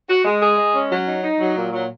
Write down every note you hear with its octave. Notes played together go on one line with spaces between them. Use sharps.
F#4
G#3
G#4
G#3
C#4
F#3
D#4
D#4
F#3
A#2
F#3